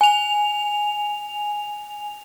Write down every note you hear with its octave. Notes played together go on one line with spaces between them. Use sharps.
G#5 F7